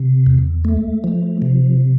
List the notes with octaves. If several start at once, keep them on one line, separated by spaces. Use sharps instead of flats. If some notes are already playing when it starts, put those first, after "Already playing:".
Already playing: C3
E2
A3
F3
C3